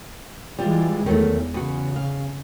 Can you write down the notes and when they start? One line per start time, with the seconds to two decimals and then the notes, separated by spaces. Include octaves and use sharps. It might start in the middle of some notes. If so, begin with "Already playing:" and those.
0.59 E3 G3 G#3 F4
1.06 E2 D#3 F#3 A3
1.54 E2 C#3 F#4
1.96 F5